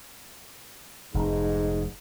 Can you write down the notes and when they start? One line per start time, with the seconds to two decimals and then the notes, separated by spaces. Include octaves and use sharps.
1.14 F1 G#2